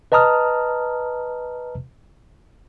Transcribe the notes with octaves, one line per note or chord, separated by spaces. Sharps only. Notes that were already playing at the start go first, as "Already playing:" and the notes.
B4 D#5 A5 A#5 D#6 F6